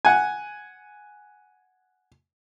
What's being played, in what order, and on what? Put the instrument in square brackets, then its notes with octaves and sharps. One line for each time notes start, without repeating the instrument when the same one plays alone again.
[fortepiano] F#5 G#5